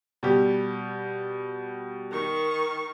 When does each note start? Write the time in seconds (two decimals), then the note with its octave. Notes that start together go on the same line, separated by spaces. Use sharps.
0.23 B2 G3 G4
2.11 D#3 C#6